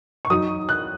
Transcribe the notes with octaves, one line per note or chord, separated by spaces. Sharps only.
C#6
F#3 D#4 D#6
F#6